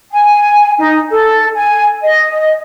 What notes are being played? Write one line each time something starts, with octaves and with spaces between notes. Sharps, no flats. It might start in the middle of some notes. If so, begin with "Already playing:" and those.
G#5
D#4
A4
G#5
D#5